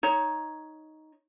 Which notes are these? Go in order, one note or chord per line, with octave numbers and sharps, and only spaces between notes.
D#4 C#5